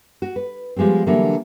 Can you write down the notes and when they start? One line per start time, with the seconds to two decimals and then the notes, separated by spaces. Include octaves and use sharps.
0.22 F#4
0.36 B4
0.76 F3 G3 G#3 B3 C4
1.07 D3 E3 F#3 G3 A#3 D4